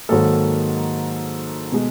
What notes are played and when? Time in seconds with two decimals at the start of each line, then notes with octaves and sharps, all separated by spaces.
0.09 G#2 D#3 F#3 A#3 A4
1.72 B2 G#3